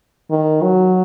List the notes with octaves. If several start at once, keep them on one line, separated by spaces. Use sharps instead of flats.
D#3
F#3